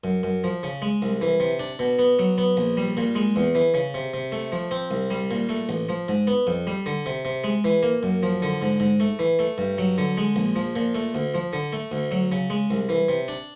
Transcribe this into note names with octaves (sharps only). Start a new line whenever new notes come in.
F#2
F#2
F3
C#3
G#3
C2
E3
C3
D4
B2
B3
F#3
B3
A#1
G3
A#2
G#3
E2
E3
C#3
C3
C3
A3
F3
C4
C2
G3
A#2
A3
A1
F3
G#2
B3
F2
G3
D3
C3
C3
G#3
E3
A#3
F#2
F3
D3
G#2
G#2
A3
E3
A3
G2
F#3
D3
G#3
A#1
F3
A#2
A3
D2
F3
D3
A3
D2
F#3
C#3
G#3
C2
E3
C3
D4